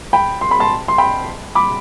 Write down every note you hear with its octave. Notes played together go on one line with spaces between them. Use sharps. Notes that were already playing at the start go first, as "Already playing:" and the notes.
G5 B5
C6
B5
A5 C6
C6
G5 B5
B5 D6